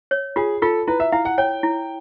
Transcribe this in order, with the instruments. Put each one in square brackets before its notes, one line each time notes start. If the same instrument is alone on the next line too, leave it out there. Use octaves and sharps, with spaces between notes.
[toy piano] C#5
[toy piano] F4 [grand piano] G#4
[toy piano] F4 [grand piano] A4
[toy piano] E4 [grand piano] B4
[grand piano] E5
[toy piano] E4 [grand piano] F5
[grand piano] F#5
[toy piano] C#5 [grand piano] G5
[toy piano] E4